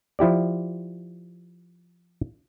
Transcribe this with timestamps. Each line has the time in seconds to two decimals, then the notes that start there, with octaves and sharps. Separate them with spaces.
0.19 F3 E4 G4 D5